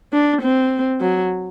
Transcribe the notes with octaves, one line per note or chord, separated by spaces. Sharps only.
D4
C4
F#3